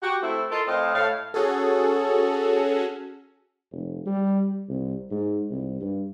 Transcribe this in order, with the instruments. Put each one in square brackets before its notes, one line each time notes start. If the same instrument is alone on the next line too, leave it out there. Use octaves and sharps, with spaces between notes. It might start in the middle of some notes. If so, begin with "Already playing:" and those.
[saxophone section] F#4 G4
A3 C4 E4
F4 A4 A#4 D#5
A2 C4 D#5 F5
A2 F5
[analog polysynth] C#4 F#4 G#4 A4
[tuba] F1
G3
C2
G#2
C2
G2